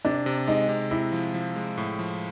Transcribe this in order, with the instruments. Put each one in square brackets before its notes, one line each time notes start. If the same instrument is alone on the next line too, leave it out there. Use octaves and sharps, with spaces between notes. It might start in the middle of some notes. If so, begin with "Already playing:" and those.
[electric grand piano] C3 [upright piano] D4
[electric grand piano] C3
[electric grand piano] G#3 [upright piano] D#4
[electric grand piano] C3
[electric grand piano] C3 [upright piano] E4
[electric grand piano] F3
F3
G#3
A2
F3